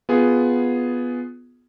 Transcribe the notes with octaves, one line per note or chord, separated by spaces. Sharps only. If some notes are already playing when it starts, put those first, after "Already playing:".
B3 F4 G#4